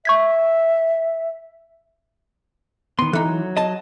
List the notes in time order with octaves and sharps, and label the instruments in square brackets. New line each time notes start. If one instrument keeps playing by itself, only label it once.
[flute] E5 [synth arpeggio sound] C#6 G#6 B6
[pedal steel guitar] D#3 B3 [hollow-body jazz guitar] C6
[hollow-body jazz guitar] E3 D#4 [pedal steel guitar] A4 F#6
[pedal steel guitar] F#3
[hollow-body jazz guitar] D#5 A5